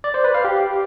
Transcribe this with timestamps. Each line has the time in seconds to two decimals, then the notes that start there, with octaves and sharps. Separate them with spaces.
0.04 D5
0.14 C5
0.24 B4
0.34 F5
0.44 G4